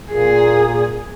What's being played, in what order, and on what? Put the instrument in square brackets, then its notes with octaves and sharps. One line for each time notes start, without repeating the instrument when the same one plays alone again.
[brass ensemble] A#2 [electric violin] G#4